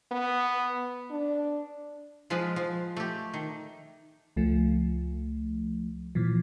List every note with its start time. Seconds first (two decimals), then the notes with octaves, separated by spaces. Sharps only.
0.11 B3
1.11 D4
2.30 F3 G#3 F4 B4
2.56 F3
2.97 A3 G4
3.34 D#3
4.36 C#2 F3 A3
6.15 A#2 E3 F3